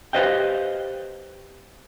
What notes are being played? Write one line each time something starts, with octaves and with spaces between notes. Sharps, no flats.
G4 B4 C5 D#5 F5 G5